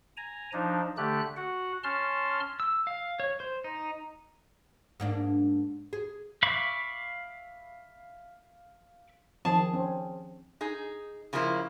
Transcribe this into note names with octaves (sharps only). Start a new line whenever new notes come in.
G#5 A#5
F3 D4 D#4
D3 A3 G4 F#6
F#4 F#5
C#4 A5 C6 F6
E6
F5
C#5
C5
D#4
G#2 A#3 D4
G#4
E5 F5 B5 C#6 D6
D#3 F3 C4 G#4 A5
C4 C#4
D#4 G#4
C#3 F3 G#3 A#3 E4